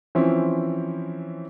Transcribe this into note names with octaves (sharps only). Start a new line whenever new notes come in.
E3 F3 C4 C#4 E4